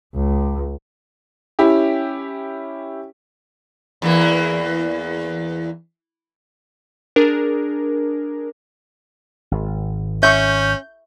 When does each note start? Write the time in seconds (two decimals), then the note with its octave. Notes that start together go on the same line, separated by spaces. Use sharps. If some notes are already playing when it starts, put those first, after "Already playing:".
0.15 C#2
1.59 C#4 E4 G4
4.02 E2 E3 A#3
7.16 D4 G#4 A#4
9.51 G#1
10.23 C#4 E5 C#6 G6